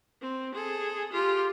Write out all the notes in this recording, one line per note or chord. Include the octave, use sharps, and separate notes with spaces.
C4
G#4 A4
F4 G4